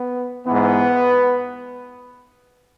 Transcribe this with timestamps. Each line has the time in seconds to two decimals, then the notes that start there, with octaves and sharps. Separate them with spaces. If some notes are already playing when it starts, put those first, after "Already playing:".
Already playing: B3
0.46 G#2 E3 B3